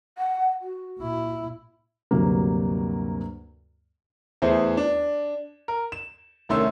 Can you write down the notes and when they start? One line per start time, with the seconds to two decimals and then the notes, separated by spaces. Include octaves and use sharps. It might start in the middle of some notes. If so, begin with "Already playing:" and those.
0.18 F#5
0.62 F#4
0.99 A#2 E4
2.11 D2 G2 C3 F#3 A#3
4.42 E2 A3 G#4 C5
4.77 D4
5.68 A#4
5.92 E7
6.49 C2 D#3 A3 C#4 C6 E6